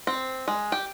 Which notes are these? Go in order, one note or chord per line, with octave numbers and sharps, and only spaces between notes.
C4
G#3
G4